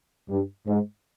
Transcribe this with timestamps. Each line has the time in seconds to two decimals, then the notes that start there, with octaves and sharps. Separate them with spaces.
0.29 G2
0.67 G#2